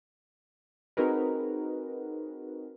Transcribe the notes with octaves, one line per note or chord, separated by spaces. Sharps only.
C4 D#4 F#4 G#4 A#4 B4